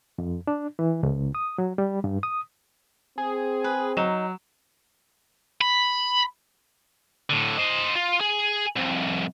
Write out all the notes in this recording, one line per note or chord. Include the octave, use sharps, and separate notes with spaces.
F2
D4
E3
C#2
D#6
F#3
G3
G2
D#6
C4 G#4
B4
F#3 D#4 E7
B5
A2 D3
C5 D#5
F4
G#4
C2 F2